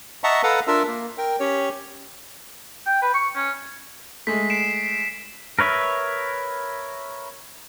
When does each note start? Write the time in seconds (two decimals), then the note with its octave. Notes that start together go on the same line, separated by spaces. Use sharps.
0.24 D#5 E5 F#5 A5 A#5 C#6
0.43 A4 B4 F5 F#5 A#5
0.67 D4 F4 A#4 E5 E6
0.87 A#3
1.18 A#4 G5
1.40 C#4 G4 C#5
2.86 G5
3.02 B4
3.14 C#6
3.35 C#4
4.27 G#3 A3 B6
4.50 C7 D7 E7
5.59 A#4 B4 C#5 E5